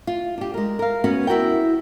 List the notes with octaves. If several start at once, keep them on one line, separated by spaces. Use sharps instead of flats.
F4
D4 G4
G#3 A#4
A#4 F5
B3 C#4 F#4 B4
E4 F#4 A#4 G5